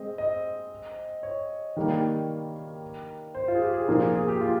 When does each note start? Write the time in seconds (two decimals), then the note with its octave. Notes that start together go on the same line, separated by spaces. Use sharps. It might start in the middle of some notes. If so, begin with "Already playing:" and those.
Already playing: G#3 C4 D#5
0.18 D#5
1.23 C#5
1.76 D#3 G3 A#3
3.35 C5
3.48 F4
3.55 G#4
3.62 G4
3.74 G#4
3.88 A#2 F3 A#3
4.15 G#4
4.28 G4
4.41 F4